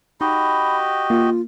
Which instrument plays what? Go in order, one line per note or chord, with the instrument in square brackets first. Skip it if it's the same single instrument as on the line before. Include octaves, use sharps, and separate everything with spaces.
[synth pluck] D#4 [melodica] F#4 G4 D#5 [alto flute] B5
[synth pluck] A#3 [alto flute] F4